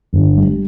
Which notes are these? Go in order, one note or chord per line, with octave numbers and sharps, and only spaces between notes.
G1
G3